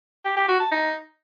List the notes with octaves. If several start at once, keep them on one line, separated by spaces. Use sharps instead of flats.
G4
G4
F#4
A5
D#4